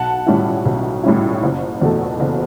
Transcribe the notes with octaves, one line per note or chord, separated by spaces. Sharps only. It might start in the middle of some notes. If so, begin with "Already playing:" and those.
Already playing: B1 F#5 A5
A2 G3 C#4 E4
B1
A2 G3 C#4 E4
F#1
E2 B2 A3
F#1